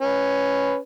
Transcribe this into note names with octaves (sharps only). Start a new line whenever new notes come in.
C#4 B4